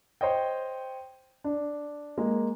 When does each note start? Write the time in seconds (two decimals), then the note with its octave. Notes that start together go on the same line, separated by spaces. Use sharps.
0.21 C5 C#5 D#5 G5
1.44 D4
2.18 G#3 A#3